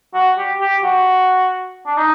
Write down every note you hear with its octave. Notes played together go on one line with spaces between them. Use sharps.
F#4
G4
G4
F#4
D4
D#4